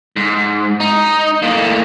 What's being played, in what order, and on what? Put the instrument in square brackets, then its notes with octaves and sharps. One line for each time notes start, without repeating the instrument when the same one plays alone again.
[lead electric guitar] G#2
D#4
A2 A#3